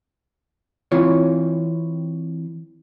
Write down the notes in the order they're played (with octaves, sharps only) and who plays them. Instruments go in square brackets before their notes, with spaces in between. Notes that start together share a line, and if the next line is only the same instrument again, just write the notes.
[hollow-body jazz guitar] E3 C4 F4 C#5